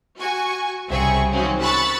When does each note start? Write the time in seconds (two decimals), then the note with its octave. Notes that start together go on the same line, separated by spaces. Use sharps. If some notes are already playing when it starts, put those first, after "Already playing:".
0.19 F#4 G#5 C#6
0.89 C2 C#3 C4 G#4 E5 C#6
1.32 D#3 F3 F#3 C4 C#4
1.62 B5 C#6 E6 F#6 A6